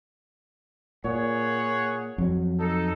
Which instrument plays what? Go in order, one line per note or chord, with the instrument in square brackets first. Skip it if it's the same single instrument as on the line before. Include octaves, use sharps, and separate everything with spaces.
[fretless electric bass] A#2 [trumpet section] G#4 C#5 F#5
[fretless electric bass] F2 F#3
[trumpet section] D#4 A4